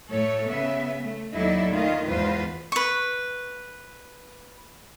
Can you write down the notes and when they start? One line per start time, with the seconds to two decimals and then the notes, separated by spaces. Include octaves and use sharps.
0.11 A2 A3 A4 C#5
0.49 C#3 B3 E5
1.01 A3
1.34 D#2 F#3 D#4 E4 A4 D5
1.72 D#3 A3 F4 D#5
2.08 E2 G#2 F4 B4 C5
2.72 B4 C#6